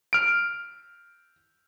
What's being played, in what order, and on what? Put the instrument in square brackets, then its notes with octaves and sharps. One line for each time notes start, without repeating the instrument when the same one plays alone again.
[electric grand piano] F6 D7